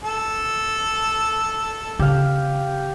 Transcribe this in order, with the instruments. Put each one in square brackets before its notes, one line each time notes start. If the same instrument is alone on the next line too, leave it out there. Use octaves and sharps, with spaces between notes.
[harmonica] A4
[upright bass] C#3 [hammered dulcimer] G4 F5